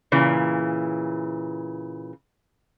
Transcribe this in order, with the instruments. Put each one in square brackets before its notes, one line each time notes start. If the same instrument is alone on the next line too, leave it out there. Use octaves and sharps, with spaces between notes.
[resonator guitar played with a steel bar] A#2 C#3 E3